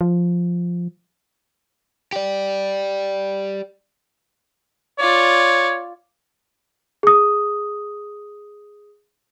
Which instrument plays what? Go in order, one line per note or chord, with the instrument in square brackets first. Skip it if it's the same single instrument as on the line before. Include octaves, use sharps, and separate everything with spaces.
[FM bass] F3
[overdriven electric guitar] G4 D5
[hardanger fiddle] F4 D5 [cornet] C#5
[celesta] G#4 D#6